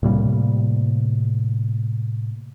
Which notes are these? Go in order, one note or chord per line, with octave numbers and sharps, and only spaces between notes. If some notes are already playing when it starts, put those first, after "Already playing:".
A2 C3 G3 A#3